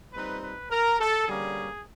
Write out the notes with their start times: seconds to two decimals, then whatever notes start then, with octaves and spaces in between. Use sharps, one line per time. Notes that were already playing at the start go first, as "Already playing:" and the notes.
0.13 A#2 G3 C4 D#4 B4
0.42 B4
0.70 A#4
0.99 A4
1.28 D3 G3 A#3 C#4 G#4